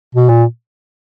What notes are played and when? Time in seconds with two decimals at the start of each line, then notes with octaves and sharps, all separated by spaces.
0.15 B2
0.29 A#2